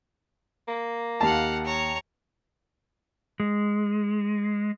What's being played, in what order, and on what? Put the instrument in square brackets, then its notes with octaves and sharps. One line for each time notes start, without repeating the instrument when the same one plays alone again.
[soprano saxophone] A#3
[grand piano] D#2 A5 [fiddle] F5 F#5
[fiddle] C#5 A#5
[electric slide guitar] G#3